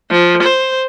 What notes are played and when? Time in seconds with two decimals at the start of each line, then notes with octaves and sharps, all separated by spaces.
0.11 F3
0.42 C5